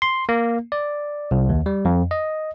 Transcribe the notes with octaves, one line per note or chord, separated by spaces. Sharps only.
C6
A#3
D5
C2
D#2
G3
F2
D#5